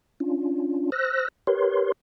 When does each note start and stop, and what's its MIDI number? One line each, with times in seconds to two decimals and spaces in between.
0.20 0.90 61
0.20 0.90 62
0.20 0.90 65
0.92 1.28 72
0.92 1.28 88
0.92 1.28 90
0.92 1.28 94
1.47 1.92 67
1.47 1.92 70
1.47 1.92 71
1.47 1.92 73
1.47 1.92 84